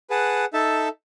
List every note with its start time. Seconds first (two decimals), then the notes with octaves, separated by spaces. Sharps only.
0.10 G#4 B4 F#5 A5
0.53 D#4 A4 E5 A5